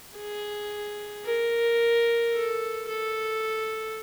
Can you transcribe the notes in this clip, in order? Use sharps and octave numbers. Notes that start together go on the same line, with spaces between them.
G#4
A#4
A4
A4